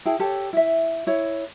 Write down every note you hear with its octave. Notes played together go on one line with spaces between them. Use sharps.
E4 G#4 G5 A5
G4 A4 C#5 A5
E4 E5
E4 C#5